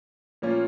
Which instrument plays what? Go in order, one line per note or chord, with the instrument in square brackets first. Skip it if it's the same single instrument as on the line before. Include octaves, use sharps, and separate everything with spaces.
[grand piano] A#2 F3 A#3 C#4 F4